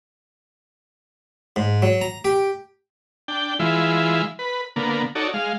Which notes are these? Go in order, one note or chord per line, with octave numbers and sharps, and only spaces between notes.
G#2
F#3
A#5
G4
D4 G5
E3 G#3 E4 F4
B4
D3 A#3 B3
D#4 F#4 A4 C#5 D5
G#3 F5